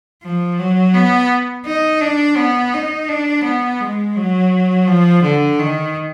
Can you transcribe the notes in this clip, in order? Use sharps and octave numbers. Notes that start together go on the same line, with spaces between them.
F3
F#3
B3
D#4
D4
B3
D#4
D4
B3
G#3
F#3
F3
D3
D#3